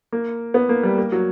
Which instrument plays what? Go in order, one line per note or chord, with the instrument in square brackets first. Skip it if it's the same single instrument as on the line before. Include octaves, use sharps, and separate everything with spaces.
[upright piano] A#3
B3
A#3
G3
A#3
F#3